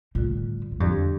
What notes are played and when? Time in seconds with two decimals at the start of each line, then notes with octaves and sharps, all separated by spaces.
0.15 A2 D3 G3 F4
0.71 G2
0.80 F2 D3 G3 D4 G4 D5